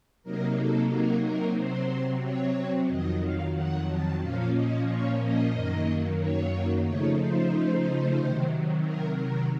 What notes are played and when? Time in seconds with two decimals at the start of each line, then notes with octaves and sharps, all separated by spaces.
0.23 C3 F#3 A#3 D#4 A#4
0.57 A4
0.89 A#4
1.23 A#4
1.56 C3 F#3 C4 C5
2.23 C#5
2.88 F2 D#3 F#3 D#5
3.21 F5
3.55 F#5
3.88 A5
4.20 A#2 F3 A#3 C#4 F5
4.54 D#5
4.87 C#5
5.21 D#5
5.52 F#2 D#3 F#3 A#3
6.19 C#5
6.85 C#3 F3 A3 D#4 C#5
7.19 C5
8.18 C3 D#3 F#3
8.83 A#4
9.16 A#4